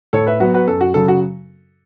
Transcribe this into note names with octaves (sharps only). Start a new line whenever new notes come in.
A2 A4 C#5
B4 E5
F#3 B3 F#4 B4
F#4 B4
F#2 A4
F#4
C#3 F#3 A4
F#4